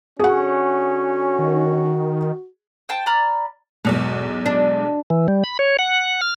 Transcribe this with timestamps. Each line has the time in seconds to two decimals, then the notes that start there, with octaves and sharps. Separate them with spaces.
0.19 D3 C#4 F#4 G#4 F#5
1.39 D#3
2.89 C5 G5 A5
3.06 D5 A#5 B5 F6
3.85 B1 E2 G#2 B2
4.46 D4
5.10 E3
5.28 G3
5.44 B5
5.59 C#5
5.79 F#5
6.21 F6